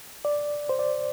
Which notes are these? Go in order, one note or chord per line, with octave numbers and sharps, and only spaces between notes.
D5
C5
D5